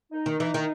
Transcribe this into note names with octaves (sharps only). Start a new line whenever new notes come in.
D#4
D#3
E3
D#3